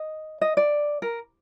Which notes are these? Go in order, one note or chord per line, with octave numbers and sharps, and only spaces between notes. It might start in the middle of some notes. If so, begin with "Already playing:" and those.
Already playing: D#5
D#5
D5
A#4